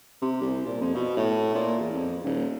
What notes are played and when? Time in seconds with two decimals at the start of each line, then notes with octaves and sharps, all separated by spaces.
0.22 C3
0.41 C2
0.66 A#2
0.81 F2
0.95 B2
1.17 A2
1.55 A#2
1.80 E2
1.94 F2
2.24 D#1